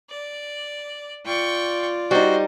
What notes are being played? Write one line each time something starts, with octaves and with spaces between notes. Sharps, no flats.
D5
F4 D5 G5 C#6
G3 D#4 F#4 C5